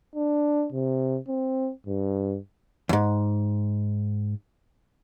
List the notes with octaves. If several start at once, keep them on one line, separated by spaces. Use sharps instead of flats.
D4
C3
C4
G2
E2 G#2